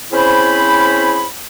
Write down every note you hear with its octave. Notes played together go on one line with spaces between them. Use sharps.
C4 C#4 E4 G#4 C5 B5